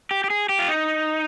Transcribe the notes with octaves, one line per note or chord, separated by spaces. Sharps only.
G4
G4
G#4
G4
F4
D#4